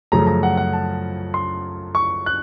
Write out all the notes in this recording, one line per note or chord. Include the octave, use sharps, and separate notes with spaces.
F#2 C#3 F3 A3 A#5
A#5
F#5
F#5
A5
C6
C#6
F#6